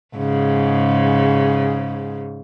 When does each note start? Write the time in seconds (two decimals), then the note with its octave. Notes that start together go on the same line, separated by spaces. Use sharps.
0.16 G#2 C#3